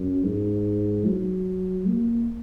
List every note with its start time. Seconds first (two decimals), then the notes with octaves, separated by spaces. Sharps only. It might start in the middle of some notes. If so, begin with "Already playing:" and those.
Already playing: F#2
0.24 G#2
1.06 F#3
1.87 A#3